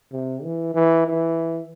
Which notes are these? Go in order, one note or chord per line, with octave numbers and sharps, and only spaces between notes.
C3
E3
E3
E3